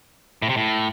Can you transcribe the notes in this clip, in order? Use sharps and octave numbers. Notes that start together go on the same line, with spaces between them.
A2
C3
A2